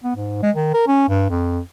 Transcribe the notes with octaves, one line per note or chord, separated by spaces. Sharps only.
B3
G#2
G#3
D#3
A#4
C#4
G2
F2